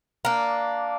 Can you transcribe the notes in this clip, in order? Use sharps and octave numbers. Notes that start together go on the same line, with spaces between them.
A#3 D4